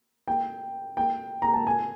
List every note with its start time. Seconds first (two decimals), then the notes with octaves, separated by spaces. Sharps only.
0.28 G5
0.97 G5
1.42 A#5
1.54 A5
1.67 G#5